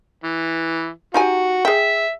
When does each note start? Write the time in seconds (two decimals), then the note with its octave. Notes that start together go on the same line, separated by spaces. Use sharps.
0.24 E3
1.14 D#4 F#4 G4 G#5
1.65 G#4 E5 G5